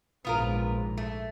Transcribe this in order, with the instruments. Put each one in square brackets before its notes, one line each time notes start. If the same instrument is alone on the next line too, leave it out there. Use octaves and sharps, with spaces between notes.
[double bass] A#1 G#2 [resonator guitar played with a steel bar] B3 F4 A#4
[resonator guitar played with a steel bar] A3